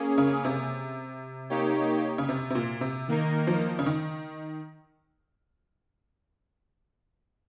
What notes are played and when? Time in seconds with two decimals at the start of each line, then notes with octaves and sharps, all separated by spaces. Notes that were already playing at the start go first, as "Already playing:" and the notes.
Already playing: A#3 C#4 G#4
0.18 C#3
0.45 C3
1.50 A#3 D#4 G4 C#5
2.18 C#3
2.29 C3
2.50 C3
2.55 A#2
2.81 C3
3.08 D#3 A#3 D#4 A#4
3.47 F3
3.79 C#3
3.86 D#3